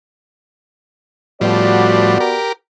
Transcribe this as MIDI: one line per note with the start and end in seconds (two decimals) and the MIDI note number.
1.41 2.18 45
1.41 2.18 53
1.41 2.18 55
1.41 2.36 59
1.41 2.36 66
1.41 2.36 74
2.20 2.52 67
2.20 2.52 70